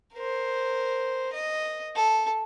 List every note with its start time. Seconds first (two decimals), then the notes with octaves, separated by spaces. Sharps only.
0.13 A#4 C5
1.33 D#5
1.95 A4